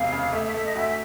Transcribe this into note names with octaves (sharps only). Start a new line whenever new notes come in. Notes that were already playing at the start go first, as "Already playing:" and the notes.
Already playing: E1 C3 F5
C#3
A3 E5
E5
A3 E5
D#5
D2 E5